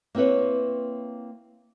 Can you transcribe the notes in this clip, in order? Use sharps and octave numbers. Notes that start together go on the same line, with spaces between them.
A#3 C4 E4 B4 C#5